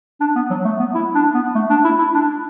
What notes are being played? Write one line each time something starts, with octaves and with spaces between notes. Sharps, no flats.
D4
B3
F#3
A3
B3
E4
D4
B3
A3
D4
E4
E4
D4